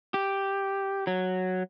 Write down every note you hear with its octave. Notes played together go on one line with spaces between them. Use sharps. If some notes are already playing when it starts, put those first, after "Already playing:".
G4
F#3